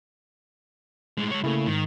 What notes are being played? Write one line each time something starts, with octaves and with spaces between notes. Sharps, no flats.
A2 G#3
G#3 C#5
C#3 A3 A#3 E4
G#2 D#3